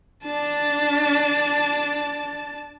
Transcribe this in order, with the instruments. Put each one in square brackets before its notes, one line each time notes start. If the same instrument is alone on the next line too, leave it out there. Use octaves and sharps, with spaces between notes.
[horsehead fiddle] D4 A5